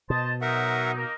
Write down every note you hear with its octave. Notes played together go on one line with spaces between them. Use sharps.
B2 C5 D#5 A5
F#3 D#4 A#4 E5 F#5
A#3 D#4 A#4